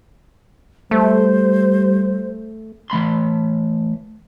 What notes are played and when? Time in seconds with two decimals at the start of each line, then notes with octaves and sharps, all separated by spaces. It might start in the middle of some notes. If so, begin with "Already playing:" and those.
0.91 G3 A3 C5
2.90 E3 A3 B5 C6